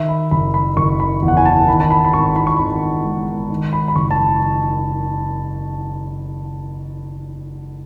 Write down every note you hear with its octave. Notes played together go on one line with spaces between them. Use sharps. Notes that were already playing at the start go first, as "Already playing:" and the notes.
Already playing: D#3 E5
B5
F#1 B5
B5
F#1 C#6
B5
E2
F#5
G#5
A5
D#3 B5
A5
B5
B5
G#1 C#6
B5
C#6
G#1 B5
G#2
D#3
B5
B5
F#1 C#6
A5